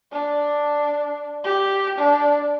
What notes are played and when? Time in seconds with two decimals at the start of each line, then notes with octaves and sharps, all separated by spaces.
0.12 D4
1.44 G4
1.98 D4